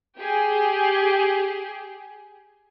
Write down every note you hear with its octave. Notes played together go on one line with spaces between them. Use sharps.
G4 G#4